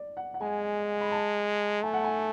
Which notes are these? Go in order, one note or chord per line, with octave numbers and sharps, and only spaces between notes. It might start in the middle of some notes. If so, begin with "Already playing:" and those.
Already playing: D5
F#5
F#5
G#3 G#5
B5
A5
A3 G#5
F#5
G#5